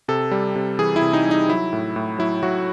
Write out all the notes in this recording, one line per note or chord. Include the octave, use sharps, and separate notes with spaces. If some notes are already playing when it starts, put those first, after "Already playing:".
C3 A4
G3
C3
E3 G#4
E4
C3
D#4
G3
D#4
F#3 E4
A2
A2
F#3 E4
F#3 F#4